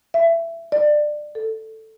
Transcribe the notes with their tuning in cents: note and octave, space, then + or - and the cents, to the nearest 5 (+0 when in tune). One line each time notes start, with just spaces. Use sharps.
E5 +20
D5 +20
A4 +5